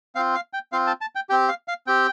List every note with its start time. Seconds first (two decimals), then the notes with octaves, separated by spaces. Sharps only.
0.15 C4 F4 F5
0.35 F5
0.53 G5
0.72 C4 F4 F5
0.87 A5
1.01 A5
1.15 G5
1.30 C4 G4 G5
1.48 F5
1.68 F5
1.87 C4 G4 G5